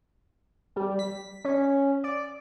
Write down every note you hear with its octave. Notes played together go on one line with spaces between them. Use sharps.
G3
B6
C#4
D5